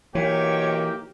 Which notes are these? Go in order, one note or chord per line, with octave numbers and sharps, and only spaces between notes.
B1 D#3 E3 A#3 G4 C#5 G5